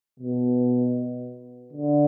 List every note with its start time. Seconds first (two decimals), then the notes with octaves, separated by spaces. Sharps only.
0.20 B2
1.73 D3